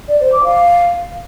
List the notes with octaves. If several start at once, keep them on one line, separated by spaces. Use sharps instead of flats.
D5
C5
D6
F5